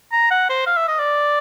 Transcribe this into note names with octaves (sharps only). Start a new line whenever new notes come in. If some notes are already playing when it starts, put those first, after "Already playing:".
A#5
F#5
C5
F5
E5
D#5
D5